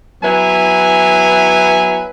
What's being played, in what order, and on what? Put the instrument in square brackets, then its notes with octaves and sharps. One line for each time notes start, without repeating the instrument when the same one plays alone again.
[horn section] F#3 B3 E4 B4 G#5